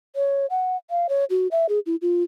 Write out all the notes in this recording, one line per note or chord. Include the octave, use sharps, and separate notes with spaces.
C#5
F#5
F5
C#5
F#4
E5
G#4
E4
F4